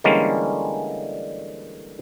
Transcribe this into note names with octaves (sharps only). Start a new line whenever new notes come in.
D3 E3 G3 G#3 A#3 C#4